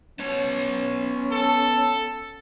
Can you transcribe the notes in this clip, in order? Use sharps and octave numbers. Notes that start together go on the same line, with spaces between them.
B3 C#4 C#5
A4